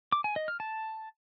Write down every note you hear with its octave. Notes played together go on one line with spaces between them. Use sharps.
D6
G#5
D#5
F6
A5